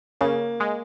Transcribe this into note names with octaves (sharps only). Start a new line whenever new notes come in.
C#3 A#3
G#3